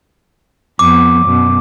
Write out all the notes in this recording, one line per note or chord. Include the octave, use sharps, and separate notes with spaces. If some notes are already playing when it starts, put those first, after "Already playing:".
F2 B3 D6
F#2 B2